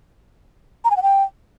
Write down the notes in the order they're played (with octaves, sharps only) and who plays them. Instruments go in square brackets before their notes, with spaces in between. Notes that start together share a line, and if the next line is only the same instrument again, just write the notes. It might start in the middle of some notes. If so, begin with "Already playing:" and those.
[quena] A#5
G#5
F#5
G5